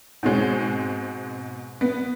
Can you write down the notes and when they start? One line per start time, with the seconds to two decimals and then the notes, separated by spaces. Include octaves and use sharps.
0.23 G#2 B2 G#3 C4
1.81 B3